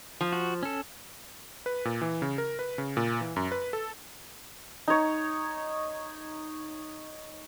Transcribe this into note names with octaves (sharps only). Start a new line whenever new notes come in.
F3
F#4
C#4 A4
B4
A#2
E3
C#3
A#4
B4
C#3
A#2
E3
F#2
B4
A4
D#4 C#5